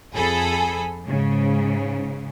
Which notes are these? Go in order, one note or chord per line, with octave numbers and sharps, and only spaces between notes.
F2 G#4 A4 B5
G#2 C#3